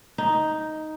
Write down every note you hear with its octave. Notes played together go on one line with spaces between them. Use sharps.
D#4